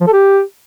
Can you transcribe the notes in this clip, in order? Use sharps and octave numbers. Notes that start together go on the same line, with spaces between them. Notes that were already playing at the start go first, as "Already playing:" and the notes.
F3
A4
G4